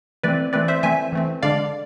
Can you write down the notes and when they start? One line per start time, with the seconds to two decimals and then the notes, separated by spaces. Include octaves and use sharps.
0.23 E3 A3 C4 B4 D5
0.53 E3 A3 C4 B4 D5
0.68 C5 E5
0.83 E3 A3 C4 E5 G#5
1.13 E3 A3 C4
1.43 D3 G#3 D4 D5 F5